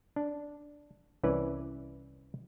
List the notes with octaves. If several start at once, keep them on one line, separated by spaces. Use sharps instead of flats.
D4
C2 E3 C#4 B4 D5